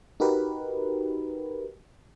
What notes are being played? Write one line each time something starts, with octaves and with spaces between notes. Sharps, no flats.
D#4 F#4 G4 A#4 B4